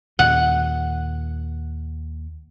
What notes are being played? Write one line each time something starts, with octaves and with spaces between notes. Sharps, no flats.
D#2 A#2 F#5